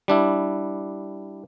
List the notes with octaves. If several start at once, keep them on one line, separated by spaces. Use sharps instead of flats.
G3 D4 E4